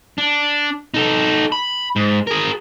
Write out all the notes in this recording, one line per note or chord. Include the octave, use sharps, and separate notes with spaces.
D4
D#4 A4
B5
G#2
G#4 A#4